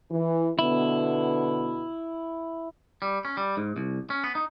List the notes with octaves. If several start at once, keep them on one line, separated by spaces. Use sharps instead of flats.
E3
B2 D3 B3 E4
G3
C#4
G3
G#2
C2
C#4
B3
D#4